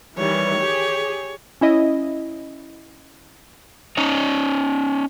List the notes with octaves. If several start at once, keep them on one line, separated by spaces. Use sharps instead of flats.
D#3 E3 G3 C#5
G4 G#4
C#4 E4 D#5
C#4 D#4 C#5